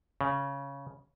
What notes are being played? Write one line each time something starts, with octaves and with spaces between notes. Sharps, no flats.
C#3